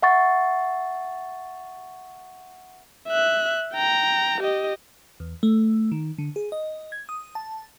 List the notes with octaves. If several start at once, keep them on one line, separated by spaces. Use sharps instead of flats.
E5 F#5 C#6 A6
E5 F#6
G5 A#5
G4 D#5
E2
A3
D#3
D3
G#4
D#5
G#6
D#6
A5